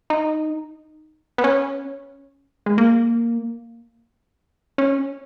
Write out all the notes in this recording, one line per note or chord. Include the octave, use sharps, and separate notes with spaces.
D#4
B3
C#4
G#3
A#3
C#4